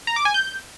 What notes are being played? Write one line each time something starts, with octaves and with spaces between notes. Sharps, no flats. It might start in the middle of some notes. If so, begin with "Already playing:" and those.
A#5
D6
G#5
G6